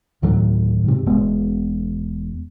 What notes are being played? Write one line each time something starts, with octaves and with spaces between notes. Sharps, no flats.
D2 A2 D#3 F#3
G#2 C3
E1 G#3 B3